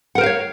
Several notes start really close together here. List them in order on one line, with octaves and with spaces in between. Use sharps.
F#5 A#4 C5 F5 C#5